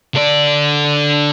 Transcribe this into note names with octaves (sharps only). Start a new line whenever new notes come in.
D3 D5